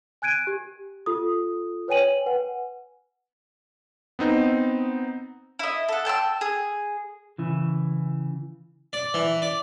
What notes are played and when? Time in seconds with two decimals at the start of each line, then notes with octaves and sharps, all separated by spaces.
0.22 G#5 F#6 G#6 D7 D#7
0.47 G4
1.06 F4 A4 D#6
1.88 B4 C#5 G5 G#5 D#7 F#7
2.26 B4 F#5 G#5
4.19 B3 C4 D#4
5.59 E4 D#5
5.89 A4 F#5
6.05 G5 A5 C6 E6
6.41 G#4
7.38 C#3 E3
8.93 D5
9.14 E3
9.42 D5